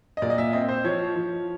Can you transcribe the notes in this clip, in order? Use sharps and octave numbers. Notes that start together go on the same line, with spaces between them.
D#5
A#2 D5
D#5
E5
C4 D#5
C5
F3 C#5
F3